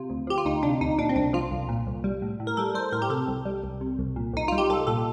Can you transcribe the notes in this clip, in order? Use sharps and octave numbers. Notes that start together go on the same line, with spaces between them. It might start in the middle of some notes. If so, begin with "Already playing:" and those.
Already playing: C3 F4
D2
F3 G4
F4
D2 D#4
C3 D4
D2 D#4
A#2 D4
C4
C2 D4
F3 F4
C2
A#2
C2
G3
A2
A2
A#4
G3 A4
G3 C5
A2 A#4
G4
C3 A4
C2
G3
C2
C3
C2
A#2
C2 D#4
G3 F4
G4
C2 A4
A#2 A4